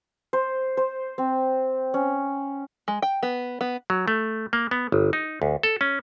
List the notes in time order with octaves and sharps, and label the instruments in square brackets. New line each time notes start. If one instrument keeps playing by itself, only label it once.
[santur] C5
C5
C4
C#4
[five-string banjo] G#3
G5
B3
B3
[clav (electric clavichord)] F#3
A3
A#3
B3
G1
D#4
D2
A4
C#4